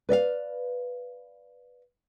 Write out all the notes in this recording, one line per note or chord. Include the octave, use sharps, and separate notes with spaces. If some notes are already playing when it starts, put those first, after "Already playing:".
B4 D5 E5 F5